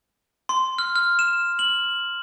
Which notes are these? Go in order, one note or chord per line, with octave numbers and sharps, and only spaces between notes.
C6
F6
F6
E7
F#7